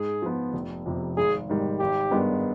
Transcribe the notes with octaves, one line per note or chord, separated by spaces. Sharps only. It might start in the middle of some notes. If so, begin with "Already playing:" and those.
Already playing: G#2 G#4
F3 B3
F1
F2 C3
G#1 G#4
G#2 D#3 G3
G#1 G4
G2 D#3 G#3 B3